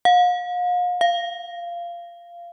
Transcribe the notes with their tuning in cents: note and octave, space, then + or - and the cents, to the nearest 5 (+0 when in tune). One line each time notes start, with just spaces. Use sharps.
F5 +40
F5 -15